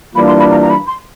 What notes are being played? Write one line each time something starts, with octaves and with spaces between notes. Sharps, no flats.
E3 G3 A#3 D4 F4 B5
C6
B5
A#5
A#5
B5
C6